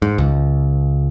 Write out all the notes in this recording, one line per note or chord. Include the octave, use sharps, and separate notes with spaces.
G#2
C#2